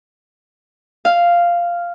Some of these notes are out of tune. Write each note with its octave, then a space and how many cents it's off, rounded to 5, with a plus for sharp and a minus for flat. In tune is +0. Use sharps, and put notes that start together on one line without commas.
F5 -5